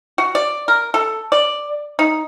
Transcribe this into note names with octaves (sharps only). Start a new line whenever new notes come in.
F#4
D5
A#4
A4
D5
D#4